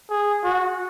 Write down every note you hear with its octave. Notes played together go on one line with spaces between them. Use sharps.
G#4
F#4